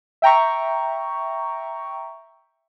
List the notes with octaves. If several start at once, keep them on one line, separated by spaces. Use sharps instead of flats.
E5 G5 A#5 C#6